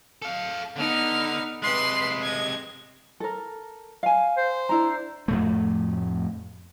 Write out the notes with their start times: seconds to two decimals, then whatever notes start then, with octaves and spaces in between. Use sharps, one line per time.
0.22 A4 F5
0.76 D3 B3 D#4 F6
1.62 C3 G#3 B4 B5 C6
2.23 D#5 G#6
3.20 A4 A#4
4.03 F5 G#5
4.37 C5
4.69 D4 E4 A#5
5.28 F2 A2 A3